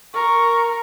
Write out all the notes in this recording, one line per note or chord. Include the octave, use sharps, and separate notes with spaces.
A#4 C#6